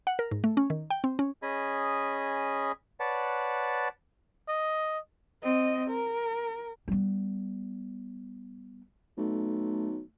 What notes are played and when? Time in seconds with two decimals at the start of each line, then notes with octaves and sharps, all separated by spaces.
0.07 F#5
0.19 A#4
0.31 G#2
0.44 A3
0.57 C#4
0.70 D#3
0.90 G5
1.04 C4
1.19 C#4
1.42 C#4 G#4 D#5 G#5 B5
3.00 B4 C#5 D5 F#5 A5
4.48 D#5
5.43 C4 D#5
5.90 A#4
6.88 G3 B3
9.17 B1 A3